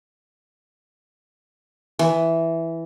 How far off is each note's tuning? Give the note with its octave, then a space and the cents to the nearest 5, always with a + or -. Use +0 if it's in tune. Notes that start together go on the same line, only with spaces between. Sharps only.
E3 +0